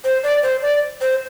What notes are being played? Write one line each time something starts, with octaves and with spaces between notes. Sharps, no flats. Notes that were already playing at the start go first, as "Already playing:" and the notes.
C5
D5
C5
D5
C5